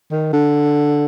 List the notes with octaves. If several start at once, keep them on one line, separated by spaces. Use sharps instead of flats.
D#3
D3